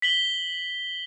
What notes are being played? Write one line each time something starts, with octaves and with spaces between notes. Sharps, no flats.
B6 F#7 G7